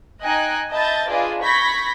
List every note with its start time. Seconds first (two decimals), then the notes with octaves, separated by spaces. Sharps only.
0.23 D#4 D#5 G5 G#5 F#6
0.70 D#5 E5 A5 B5 G6 A6
1.08 D4 F4 G#4 B4 D5 D#5
1.42 B5 C#6 G6 G#6 A#6 B6